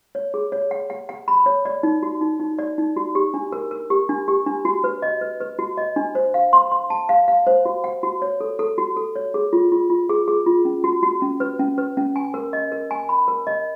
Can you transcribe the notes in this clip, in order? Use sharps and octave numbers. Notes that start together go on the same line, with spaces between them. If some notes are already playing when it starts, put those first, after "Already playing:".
C#5
G#4
C#5
F#5
F#5
F#5
B5
C#5
D5
D#4
F#4
D#4
D#4
D5
D#4
F#4
G4
D4
A#4
A#4
G4
D4
G4
D4
F#4
B4
D#5
B4
B4
F#4
D#5
D4
C5
F5
C6
C6
A5
F5
F5
C5
F#4
F#5
F#4
C#5
A4
A4
F#4
A4
C#5
G#4
F4
F4
F4
G#4
G#4
F4
C#4
F#4
F#4
C#4
B4
C#4
B4
C#4
G#5
A#4
D#5
A#4
G#5
B5
A#4
D#5